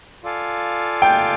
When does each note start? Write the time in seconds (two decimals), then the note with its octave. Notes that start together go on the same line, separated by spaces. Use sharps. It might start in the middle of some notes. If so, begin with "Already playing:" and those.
0.23 F4 A4 D5 F5 G#5
1.02 G5